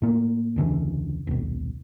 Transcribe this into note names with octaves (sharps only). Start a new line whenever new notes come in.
A2 A#3
E1 C#2 D3 E3
D#1 B1